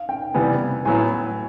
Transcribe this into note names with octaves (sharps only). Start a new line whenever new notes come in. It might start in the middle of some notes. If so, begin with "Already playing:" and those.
Already playing: F5
G5
C3 E3 G3 B3 G#5
A2 F#3 B3 E4 G#5